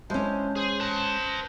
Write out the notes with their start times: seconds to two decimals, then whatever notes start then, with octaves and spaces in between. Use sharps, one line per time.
0.10 G#3 C#4 D4 E4 C5
0.56 G#4 C5
0.80 B4 A5